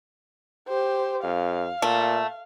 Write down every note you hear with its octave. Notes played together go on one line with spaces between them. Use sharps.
G4 C5
F2 F5
A#2 A3